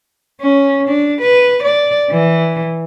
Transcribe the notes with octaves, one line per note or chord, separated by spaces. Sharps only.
C#4
D4
B4
D5
E3